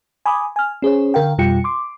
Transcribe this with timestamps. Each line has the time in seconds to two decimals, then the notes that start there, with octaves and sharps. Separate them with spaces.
0.26 G#5 B5 D6 D#6
0.56 G#5 F6
0.82 C#4 G#4 C5 C#5
1.14 D3 A#4 F5 G5
1.38 F2 B2 G3 F4 G5 C#7
1.64 C6 D6